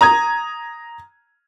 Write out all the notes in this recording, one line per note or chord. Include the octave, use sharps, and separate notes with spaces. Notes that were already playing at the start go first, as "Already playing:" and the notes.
A#5 D#6 G#6